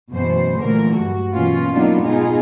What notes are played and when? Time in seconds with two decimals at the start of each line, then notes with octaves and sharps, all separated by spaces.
0.11 F#2 B2 E3 A3 B3 C5
0.58 A#2 D3 E3 F#3 A3 A#4
0.94 G2 F#4
1.32 B2 E3 F#3 A#3 C#4 F4
1.73 F#3 A#3 B3 D4 D#4 F4
2.04 G#2 B2 B3 D#4 F4 G#4